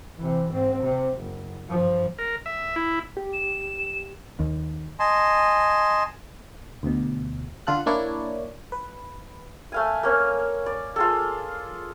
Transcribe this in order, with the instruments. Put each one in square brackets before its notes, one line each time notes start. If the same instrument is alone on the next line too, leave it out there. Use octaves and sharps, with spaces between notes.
[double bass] C3 E3
G#2 C4
C3
F#1
G2 F3
[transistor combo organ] A#4
E5
E4
[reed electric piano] G4
[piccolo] E7
[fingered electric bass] D#2
[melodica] D#5 G#5 A5 C6
[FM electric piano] D2 B2
D3 F4 A4 F#6
A#3 D4 E4 C#5 D5
B4
[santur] A3 F5 G#5
A#3 C#4
D5
F4 G#4 A4